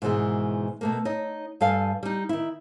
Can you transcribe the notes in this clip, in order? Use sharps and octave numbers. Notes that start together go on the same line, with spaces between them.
G#2 B2 D#3 E3 G#3
B2 A3 A#3
D#4 C#5 D#5
G2 A4 F5 G#5
G3 D#4
D#3 E4